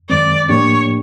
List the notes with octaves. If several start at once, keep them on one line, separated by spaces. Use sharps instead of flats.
F#2 D#3 G#3 C4 D5
A2 F3 A#3 D4 G4 C#5